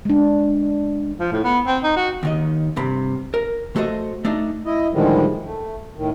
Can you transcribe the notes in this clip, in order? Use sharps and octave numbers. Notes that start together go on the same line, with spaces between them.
G#3 D4
F3
A2
B3
C4
D#4
F#4
D#2 D#3 D#5
G2 C3 B5
A#4
A3 F#4 A4 C5 D#5
A3 D4 D#4
E4 D#5
A2 D3 D#3 F3 G3 G#3
A3
A2 D#3